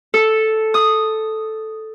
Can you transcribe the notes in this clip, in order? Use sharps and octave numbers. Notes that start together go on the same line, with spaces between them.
A4
D#6